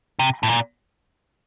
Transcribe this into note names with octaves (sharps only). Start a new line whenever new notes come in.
C3
A2
A#2